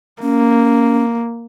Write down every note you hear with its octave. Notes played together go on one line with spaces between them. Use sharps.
A#3 C#4